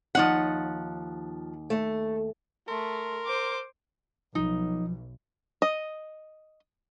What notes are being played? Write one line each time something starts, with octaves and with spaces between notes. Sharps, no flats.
D#2 F3 D#4 C#5 F#5
A3
A3 A#4 C6
C5 D6
B1 F3 D#4
D#5